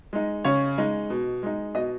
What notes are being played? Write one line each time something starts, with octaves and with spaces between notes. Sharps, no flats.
G#3 D#4
C#3 C#5
G#3 D#4
B2
G#3 D#4
B2 D#5